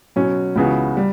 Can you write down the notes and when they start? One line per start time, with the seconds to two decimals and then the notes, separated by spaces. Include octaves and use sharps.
0.16 B2 F#3 C#4
0.56 C#2 C#3 E3 B3 F#4
0.97 G3